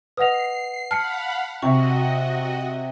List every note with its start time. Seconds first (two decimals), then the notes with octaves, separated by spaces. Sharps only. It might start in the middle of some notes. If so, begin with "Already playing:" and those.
0.17 B4 D#5 F#5 D#6 C7 F7
0.91 F5 F#5 A5 B5 F6 C7 C#7
1.62 C3 F#4 D#5 C#6